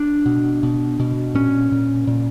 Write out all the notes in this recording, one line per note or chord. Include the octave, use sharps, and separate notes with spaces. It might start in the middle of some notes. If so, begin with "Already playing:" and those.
Already playing: D4
B2
B2
B2
A#2 C#4
A#2
A#2